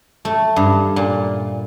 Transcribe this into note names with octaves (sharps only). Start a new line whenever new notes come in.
A3
G2
A#2